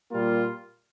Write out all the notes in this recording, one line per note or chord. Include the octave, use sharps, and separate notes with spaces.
A#2 G3 A#3 F4